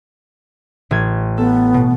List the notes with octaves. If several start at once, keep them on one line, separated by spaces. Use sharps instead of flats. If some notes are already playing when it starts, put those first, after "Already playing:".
A1 G#6
B3 A4
B2